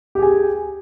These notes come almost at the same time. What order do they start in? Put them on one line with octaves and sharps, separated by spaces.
G4 G#4 G#5